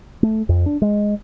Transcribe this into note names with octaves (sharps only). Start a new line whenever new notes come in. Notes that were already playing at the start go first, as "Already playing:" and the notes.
A3
F2
D4
G#3